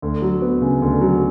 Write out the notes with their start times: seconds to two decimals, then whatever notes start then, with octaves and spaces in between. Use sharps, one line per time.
0.02 D2
0.22 F#3
0.42 B3
0.61 C#3
0.82 D2
1.01 F#3